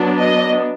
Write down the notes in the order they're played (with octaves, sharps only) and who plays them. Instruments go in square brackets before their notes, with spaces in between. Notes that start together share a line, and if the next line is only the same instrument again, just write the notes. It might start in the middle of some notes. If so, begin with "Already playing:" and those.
Already playing: [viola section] F#3 B3 D4
D#5